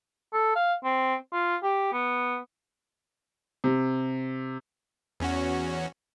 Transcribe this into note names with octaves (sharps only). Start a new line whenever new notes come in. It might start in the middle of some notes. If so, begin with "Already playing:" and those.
A4
F5
C4
F4
G4
B3
C3
E2 C#4 F#4